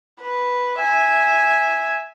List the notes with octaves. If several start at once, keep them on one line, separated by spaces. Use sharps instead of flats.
B4
E5 G#5